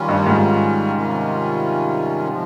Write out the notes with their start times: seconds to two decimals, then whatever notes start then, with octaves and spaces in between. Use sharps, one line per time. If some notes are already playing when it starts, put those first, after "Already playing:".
Already playing: D#3 G3 C#4 F4
0.09 G2
0.26 G#2
0.93 C3 D#3 G3 C#4 F4
2.28 C3 F3 G#3